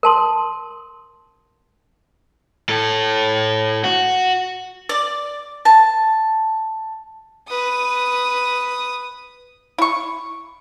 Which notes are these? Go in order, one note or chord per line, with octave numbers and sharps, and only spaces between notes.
A#4 A5 C6 D#6
A2 A4
F#4
D5
A5
B4 D#6
E4 C#6